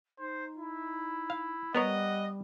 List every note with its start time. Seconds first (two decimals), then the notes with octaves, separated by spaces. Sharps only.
0.19 D#4 C5
0.56 E4
1.30 F5
1.75 G3 B3 A#4 C#5 D#5 F#5